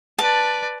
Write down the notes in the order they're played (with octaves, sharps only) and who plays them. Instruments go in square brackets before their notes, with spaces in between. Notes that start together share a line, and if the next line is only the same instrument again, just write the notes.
[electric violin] B4 D5 [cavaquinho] A5